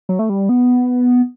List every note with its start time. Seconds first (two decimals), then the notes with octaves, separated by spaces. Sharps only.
0.09 F#3
0.19 A3
0.29 G3
0.49 B3